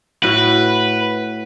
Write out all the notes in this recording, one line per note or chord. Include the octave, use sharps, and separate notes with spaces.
A2 F#4 B4